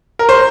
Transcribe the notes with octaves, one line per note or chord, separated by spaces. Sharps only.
A#4
C5